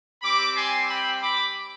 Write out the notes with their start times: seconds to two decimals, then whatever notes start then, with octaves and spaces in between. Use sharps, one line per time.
0.22 G3 C4 G4 B5 D6
0.55 G#5 C6
0.88 G5 B5
1.21 B5 D6